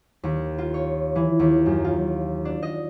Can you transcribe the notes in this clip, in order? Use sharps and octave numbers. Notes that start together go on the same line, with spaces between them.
D#2
F4
C#5
E3
D#2
F#2
F4
D4
D#5